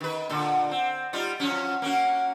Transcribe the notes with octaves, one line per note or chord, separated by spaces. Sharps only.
D#3 B4
A#2 D3 A4
C4
G3 D#4 F4
F3 F#3 C#4
A#3 C#4 F#4